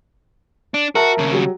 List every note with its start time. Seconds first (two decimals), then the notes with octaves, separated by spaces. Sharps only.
0.74 D4
0.95 F#4 A#4 E5 A5
1.18 D#2 C#3
1.32 F#3 G3